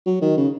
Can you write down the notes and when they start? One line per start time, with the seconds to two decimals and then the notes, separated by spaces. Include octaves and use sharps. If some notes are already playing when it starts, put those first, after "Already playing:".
0.06 F#3
0.21 D#3
0.37 C#3